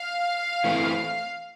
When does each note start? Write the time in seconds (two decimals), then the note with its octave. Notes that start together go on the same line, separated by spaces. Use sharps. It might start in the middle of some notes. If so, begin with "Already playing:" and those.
Already playing: F5
0.64 E3 A3 C4 E4